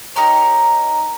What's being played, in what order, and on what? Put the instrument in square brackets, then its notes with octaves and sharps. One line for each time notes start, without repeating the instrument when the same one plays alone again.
[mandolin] D#4 G4 A#4 C#5